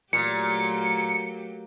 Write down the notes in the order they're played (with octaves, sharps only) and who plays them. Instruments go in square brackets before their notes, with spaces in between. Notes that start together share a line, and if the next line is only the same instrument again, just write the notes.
[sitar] A#2 [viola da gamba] F#3 A3 G4 [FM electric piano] C#7